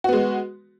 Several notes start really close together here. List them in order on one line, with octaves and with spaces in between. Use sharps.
F#4 B3 G#3